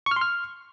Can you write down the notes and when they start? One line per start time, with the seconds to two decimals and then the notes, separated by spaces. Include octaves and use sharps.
0.06 C#6
0.11 F6
0.16 C6
0.21 F6